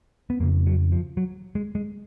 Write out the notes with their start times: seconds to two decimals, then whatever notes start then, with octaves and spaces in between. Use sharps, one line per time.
0.30 B3
0.40 F2 A#3
0.43 C#3
0.67 F#3
0.92 F3
1.17 F#3
1.55 G#3
1.75 G#3